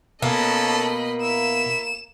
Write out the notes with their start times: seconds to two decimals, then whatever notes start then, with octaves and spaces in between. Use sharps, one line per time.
0.22 B2 A#3 C#4 A4 D#5 B5
1.22 E4 E7